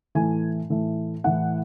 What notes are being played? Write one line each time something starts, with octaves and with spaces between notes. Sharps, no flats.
A2 E3 A3 G#5
A2 E3 A3
A2 E3 A3 F#5